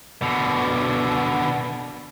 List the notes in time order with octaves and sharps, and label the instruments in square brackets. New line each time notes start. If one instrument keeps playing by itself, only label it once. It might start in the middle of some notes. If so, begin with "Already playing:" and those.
[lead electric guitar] B2 D3